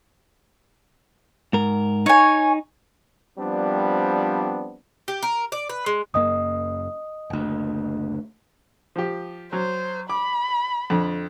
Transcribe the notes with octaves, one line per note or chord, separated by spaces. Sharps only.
G#2 A#4
D#4 C#5 G#5
F3 G3 B3 C4 D4
G4
A#4
D5
B4
G#3
F#1 F#2 A#3 D#5 D#6
F#1 D2
F3 G4
F#3 C5
B5 D6
F2 D3